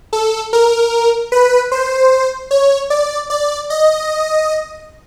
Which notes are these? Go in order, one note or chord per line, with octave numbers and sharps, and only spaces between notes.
A4
A#4
B4
C5
C#5
D5
D5
D#5